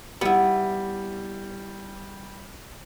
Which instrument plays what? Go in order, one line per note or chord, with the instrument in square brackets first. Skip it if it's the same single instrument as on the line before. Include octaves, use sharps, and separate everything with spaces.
[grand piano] G3 [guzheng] B3 E4